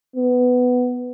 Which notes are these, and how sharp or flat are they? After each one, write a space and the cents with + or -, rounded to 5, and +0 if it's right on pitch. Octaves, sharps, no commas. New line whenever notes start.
B3 +10